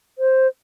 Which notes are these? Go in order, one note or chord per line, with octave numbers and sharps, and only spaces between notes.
C5